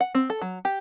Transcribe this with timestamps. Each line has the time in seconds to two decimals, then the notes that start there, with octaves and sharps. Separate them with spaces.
0.01 F#5
0.15 C4
0.30 A4
0.42 F#3
0.65 G4